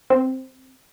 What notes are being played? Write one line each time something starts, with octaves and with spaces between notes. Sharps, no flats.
C4